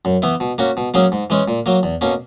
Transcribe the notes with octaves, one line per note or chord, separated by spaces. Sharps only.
F#2
E3 B3 E4
B2
A#3 C#4 F#4
B2
F#3 A#3 C#4 G#4
G#2
E3 G#3 C#4
A#2
F#3 A#3
E2
B2 A#3 C#4